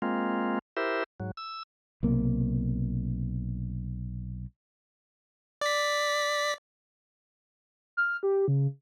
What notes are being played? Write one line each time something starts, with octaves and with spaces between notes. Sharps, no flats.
G#3 A#3 C4 F4
E4 G4 A#4 C5 E5
G#2 F#3
E6
B1 C3 A#3
D5 B6
F6
G4
C#3